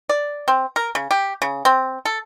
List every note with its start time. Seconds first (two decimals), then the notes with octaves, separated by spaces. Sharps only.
0.09 D5
0.48 C4
0.76 A#4
0.95 C#3
1.11 G4
1.42 C#3
1.65 C4
2.05 A4